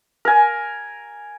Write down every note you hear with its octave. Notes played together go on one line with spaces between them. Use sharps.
A#4 G#5